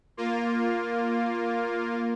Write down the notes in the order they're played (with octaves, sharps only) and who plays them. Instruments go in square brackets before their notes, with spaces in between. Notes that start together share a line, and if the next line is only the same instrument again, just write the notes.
[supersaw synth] A#3 F4